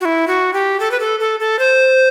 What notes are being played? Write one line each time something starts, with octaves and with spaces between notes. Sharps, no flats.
F#4
E4
F#4
G4
A4
B4
A4
A4
A4
C5